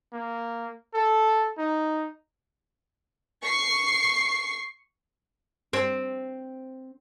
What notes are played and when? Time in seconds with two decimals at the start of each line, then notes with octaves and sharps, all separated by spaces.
0.13 A#3
0.94 A4
1.58 D#4
3.42 C#6 C7
5.73 C4